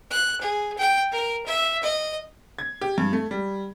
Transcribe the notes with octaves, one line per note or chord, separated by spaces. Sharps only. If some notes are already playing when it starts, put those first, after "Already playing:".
F#6
G#4
G5
A#4
E5
D#5
G#6
G4
G2
A3
G3